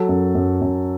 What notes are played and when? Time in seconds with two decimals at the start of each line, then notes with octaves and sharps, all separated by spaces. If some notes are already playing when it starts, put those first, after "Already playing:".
Already playing: F#3 A4
0.09 F#2
0.35 F#2
0.62 F#2